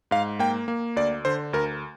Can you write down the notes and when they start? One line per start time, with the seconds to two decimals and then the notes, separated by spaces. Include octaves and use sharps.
0.11 G#2 F5
0.39 A#3 G5
0.68 A#3
0.96 D2 D5
1.25 D3 C5
1.53 D2 A#4